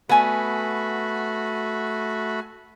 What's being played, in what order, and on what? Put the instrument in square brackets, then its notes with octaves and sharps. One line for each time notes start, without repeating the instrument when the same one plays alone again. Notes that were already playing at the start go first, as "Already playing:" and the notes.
[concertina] A3 F#4 B5 [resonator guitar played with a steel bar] B3 G#5